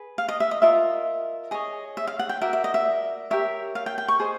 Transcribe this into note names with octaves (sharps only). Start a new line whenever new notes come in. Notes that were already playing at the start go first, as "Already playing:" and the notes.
Already playing: G#4 B4
F5
D#5
E5
D#5
F4 A#4 D#5 E5
G#4 C#5 D#5
E5
F5
F#5
G5
F#4 A#4 D5 E5
E5
D#5
E5
G4 A#4 C#5 E5
F5
G5
G5
C#6
G#4 C5 D#5